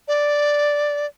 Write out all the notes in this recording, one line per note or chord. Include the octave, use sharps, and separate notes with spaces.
D5